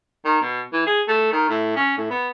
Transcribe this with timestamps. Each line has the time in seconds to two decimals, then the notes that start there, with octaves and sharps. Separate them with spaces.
0.25 D#3
0.41 B2
0.73 E3
0.86 G#4
1.08 A3
1.32 D#3
1.49 A2
1.76 C#4
1.97 A2
2.10 B3